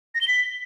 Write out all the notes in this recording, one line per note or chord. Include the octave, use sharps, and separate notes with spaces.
A#6
G7
B6